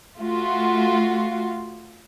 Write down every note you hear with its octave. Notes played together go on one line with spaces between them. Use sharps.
A3 F4 F#4